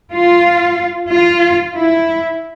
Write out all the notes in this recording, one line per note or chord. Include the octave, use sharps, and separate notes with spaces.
F4
F4
E4